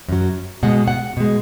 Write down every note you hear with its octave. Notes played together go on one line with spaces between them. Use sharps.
F#2 F#3
B2 G#3 F#5
F#5
B2 G#3